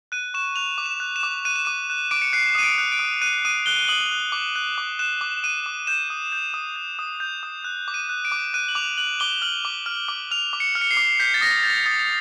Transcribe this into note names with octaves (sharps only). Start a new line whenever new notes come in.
F#6 D#7
C#6 E7
F#6 F7
D6
E7
F#6
E7
D6
F#6 D#7
E7
D6 D#7
F#6
D6 D7
C#7
F#6 C7
D#6 D#7
D7
F#6
D7
D#6
F#6 D#7
D#6 D#7
F#6 G7
D#6 F#7
F#6
D6
F#6
D6
F#6 E7
D6
F#6 D#7
D6
G6 E7
D#6
G6
D#6
G6
D#6
G6
D#6
F#6
D6
D#7
F#6
D7
D6
F#6 D#7
F#7
D6 F7
F#6 F#7
D6 G7
F6 F#7
D6
F6
D6
F6 F7
D6
C#7
F6
C#7
C7
D6
G6 B6
A6
D#6 A#6
G6 A6
D#6 A6